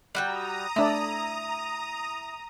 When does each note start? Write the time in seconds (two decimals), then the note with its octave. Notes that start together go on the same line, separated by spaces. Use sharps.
0.15 G3 F#4 G5 A#5 D#6
0.76 A3 D4 E4 D5